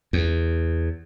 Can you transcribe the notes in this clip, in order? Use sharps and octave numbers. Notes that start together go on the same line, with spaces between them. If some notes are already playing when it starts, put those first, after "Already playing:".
E2